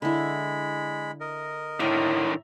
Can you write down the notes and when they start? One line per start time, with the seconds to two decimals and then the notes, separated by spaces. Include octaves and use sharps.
0.02 D3 G#3 E4 B5
1.20 A#4 D#5
1.80 A2 D3 D#3 E5 A#5